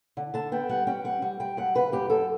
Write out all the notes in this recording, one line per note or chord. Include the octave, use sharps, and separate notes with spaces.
D3
D3 A5
B3 G5
G3 F#5
C#4 G5
G3 F#5
G3
G3 G5
F#2 F#5
C#3 B4
F#2 G4
F#2 A4